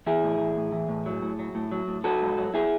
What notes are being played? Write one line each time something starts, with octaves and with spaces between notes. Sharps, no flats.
E3 E4 G#4
A2
E3
A2
E3
A2
F#3
A2
F#3
A2
F#3
A2
F#3 F#4 A4
G#2
F#3
E4 G#4